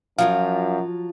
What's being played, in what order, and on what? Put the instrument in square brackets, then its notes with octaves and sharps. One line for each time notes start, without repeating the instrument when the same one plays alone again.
[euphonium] F#2 [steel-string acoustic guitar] F3 F#3 F4 [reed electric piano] F5